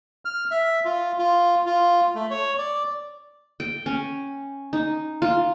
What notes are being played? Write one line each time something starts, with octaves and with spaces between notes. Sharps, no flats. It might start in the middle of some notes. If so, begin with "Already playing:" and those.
F6
E5
F4
F4
F4
A3
C#5
D5
G5
C#4
D#4
F4